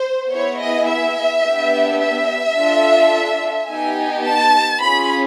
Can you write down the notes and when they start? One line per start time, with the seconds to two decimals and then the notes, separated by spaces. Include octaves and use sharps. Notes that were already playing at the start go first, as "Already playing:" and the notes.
Already playing: C5
0.32 B3 E4 G#4 C#5
0.60 D#5
0.88 E5
1.44 B3 D4 G4
2.01 E5
2.57 D4 F4 A4
3.70 B3 D#4 G4 G#5
4.26 A5
4.83 C#4 F4 G#4 B5